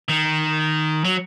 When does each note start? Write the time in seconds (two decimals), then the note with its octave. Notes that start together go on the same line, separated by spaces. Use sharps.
0.09 D#3
1.04 F#3